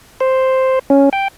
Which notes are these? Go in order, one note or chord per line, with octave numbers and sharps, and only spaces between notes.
C5
C#4
G5